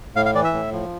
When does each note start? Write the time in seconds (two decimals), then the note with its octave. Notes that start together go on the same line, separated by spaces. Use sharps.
0.15 A2 F5
0.26 F5
0.35 E3 D5
0.44 E5
0.53 A2
0.72 F3